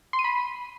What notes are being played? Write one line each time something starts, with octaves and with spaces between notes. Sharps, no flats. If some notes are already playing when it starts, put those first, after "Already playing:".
C6
D#7
B5